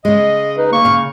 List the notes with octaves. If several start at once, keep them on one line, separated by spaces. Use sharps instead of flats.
C#3 G#3 D#5
D#4 B4
A#3 C#6
C#3 F5